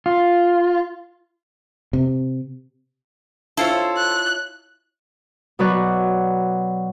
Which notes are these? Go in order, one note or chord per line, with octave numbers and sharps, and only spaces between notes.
F4
C3
E4 F4 A4 C5 C#5
F#6
B2 F#3 B4 C#5 D5